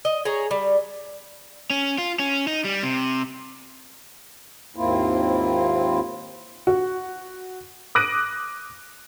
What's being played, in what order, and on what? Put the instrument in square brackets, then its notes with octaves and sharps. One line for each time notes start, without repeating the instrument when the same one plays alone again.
[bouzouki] D#5
G#4 C#5 A#5
G3
[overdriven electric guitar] C#4
F4
C#4
D#4
G3
C3
[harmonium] D#2 G#2 A#3 C4 E4 F4
[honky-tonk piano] F#4
D6 D#6 F#6 A#6 D7 D#7